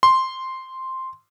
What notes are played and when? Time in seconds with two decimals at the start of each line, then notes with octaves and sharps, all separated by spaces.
0.03 C6